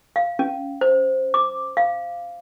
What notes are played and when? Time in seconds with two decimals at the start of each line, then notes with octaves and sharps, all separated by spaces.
0.16 F5
0.39 C#4
0.81 C5
1.34 D6
1.77 F5